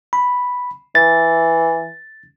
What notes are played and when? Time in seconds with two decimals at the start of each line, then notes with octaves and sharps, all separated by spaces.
0.13 B5
0.95 E3 A6